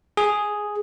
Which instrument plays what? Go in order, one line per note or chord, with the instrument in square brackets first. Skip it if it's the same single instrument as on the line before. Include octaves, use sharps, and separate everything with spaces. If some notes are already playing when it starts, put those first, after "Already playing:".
[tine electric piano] G#4